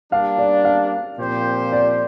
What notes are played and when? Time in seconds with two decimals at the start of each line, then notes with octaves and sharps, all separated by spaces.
0.12 G3 A#3 D4 F5
0.38 D5
0.65 F5
1.18 A#2 F3 C4 G4 C5
1.72 D5